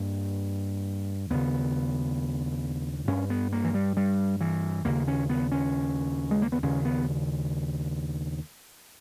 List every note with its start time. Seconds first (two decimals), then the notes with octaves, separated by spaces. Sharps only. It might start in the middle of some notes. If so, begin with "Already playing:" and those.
Already playing: G2 A#3
1.30 D#2 C#3 B3
3.07 G2 C#4
3.30 B3
3.52 A#3
3.64 E3
3.74 G3
3.97 G3
4.41 E3
4.85 D#2 C#3 A#3
5.08 C#4
5.29 B3
5.52 C#4
6.31 G#3
6.42 A#3
6.52 B3
6.63 D#2 C#3 C#4
6.85 B3